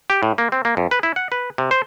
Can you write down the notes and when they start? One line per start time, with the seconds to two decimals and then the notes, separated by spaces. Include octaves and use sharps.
0.10 G4
0.23 A2
0.38 A#3
0.52 C4
0.65 A#3
0.77 F2
0.91 B4
1.03 E4
1.16 F#5
1.32 B4
1.58 C3
1.71 C5